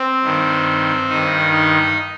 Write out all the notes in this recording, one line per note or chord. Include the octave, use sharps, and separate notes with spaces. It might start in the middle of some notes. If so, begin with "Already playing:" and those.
Already playing: C4
G2 D#3
G2 D#3 D#4
D#4